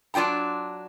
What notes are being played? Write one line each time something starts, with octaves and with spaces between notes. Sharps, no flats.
F#3 D4 F4 G5 A#5